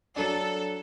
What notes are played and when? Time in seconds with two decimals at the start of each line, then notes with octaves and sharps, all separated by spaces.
0.16 F#3 D4 A4